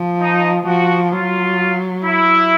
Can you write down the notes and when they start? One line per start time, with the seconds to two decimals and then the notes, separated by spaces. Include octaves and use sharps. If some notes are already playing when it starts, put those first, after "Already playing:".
Already playing: F3
0.21 D#4
0.66 F3 F#4
1.12 F#3 F4
2.05 E4